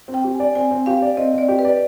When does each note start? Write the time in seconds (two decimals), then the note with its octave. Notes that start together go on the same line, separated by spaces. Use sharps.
0.08 C4
0.14 G5
0.24 G4
0.35 G#5
0.40 D5
0.55 C4 G#5
0.71 C4
0.86 G4 F5
1.02 D5
1.17 C4 D#5
1.34 C4 D5
1.48 G4
1.59 B4
1.65 D5